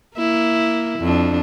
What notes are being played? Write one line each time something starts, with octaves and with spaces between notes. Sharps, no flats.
A#3 E4
F2 D4